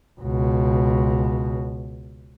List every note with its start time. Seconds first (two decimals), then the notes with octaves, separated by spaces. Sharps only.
0.20 C#2 B2